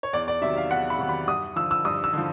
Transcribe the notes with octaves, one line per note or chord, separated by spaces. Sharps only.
C#5
E2 D5
D5
C3 D#3 F#3 E5
F5
E2 F#5
B5
C3 D#3 F#3
B5
G2 D#6
D3 F3 E6
E6
G2 D#6
E6
D3 F3